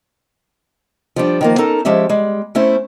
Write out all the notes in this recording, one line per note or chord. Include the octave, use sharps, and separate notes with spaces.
F3 G3 D4
D#3 F3 A#3
C#4 D#4 A4 A#4
F3 G#3 C#4 G4 E5
G3 G#3
A3 C#4 E4 C5